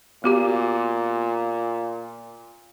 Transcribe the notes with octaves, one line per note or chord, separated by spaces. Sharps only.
A#2 B3 F#4 G4